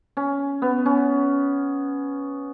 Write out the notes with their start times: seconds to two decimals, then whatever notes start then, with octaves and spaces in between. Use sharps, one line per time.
0.17 C#4
0.62 B3
0.86 C#4